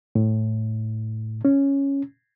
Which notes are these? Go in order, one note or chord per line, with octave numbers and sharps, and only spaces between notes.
A2
C#4